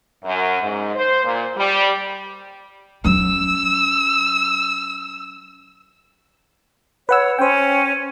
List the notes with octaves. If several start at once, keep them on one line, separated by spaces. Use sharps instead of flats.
F#2
G#2
C5
A#2
G3
F#3 C#4 E6
B4 C#5 F#5 E6
C#4 C5 G5